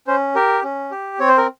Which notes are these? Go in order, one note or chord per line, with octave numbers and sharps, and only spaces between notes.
C#4 C5
G4 A#4
C#4
G4
C4 C#5
C5
A#4